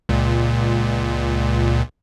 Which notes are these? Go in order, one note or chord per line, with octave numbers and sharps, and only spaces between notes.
C#2 A#2